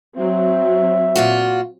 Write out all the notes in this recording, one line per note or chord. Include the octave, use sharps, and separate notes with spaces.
F#3 C4 E5
A#2 F4 F#4